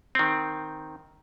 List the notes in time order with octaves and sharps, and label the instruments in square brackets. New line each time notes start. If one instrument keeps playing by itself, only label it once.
[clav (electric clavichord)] D#3 C4